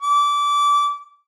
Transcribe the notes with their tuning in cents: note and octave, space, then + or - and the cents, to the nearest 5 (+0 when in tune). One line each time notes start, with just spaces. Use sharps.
D6 -20